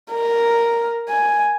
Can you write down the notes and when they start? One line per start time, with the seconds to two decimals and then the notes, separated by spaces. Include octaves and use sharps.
0.12 A#4
1.09 G#5